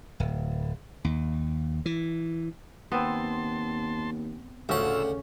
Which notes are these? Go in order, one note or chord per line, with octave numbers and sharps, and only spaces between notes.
D1
D#2
E3
D#2 B3 C4 A5 C6
D2 A2 C#3 C#4 F4 F#5 E6